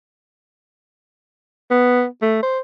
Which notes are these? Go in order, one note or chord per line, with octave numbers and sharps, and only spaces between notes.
B3
A3
C5